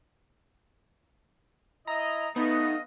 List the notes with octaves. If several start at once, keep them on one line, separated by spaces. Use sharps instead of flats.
E4 D#5 A#5 A#6
A3 B3 D#4 D#5 F5 D#6